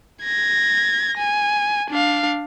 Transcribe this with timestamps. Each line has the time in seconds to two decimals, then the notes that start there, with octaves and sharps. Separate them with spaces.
0.24 G#6 A#6
1.17 G#5
1.91 D4 F5